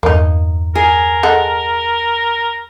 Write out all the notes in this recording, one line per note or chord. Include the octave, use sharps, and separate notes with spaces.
E2 G2 A#3 D#4
G#4 A#4
G#3 A4 F#5